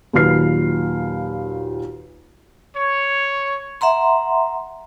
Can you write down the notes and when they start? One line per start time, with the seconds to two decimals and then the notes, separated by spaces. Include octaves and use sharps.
0.13 D#2 A#2 F#3 B4 F6 C7
2.76 C#5
3.81 E5 F#5 A#5 C6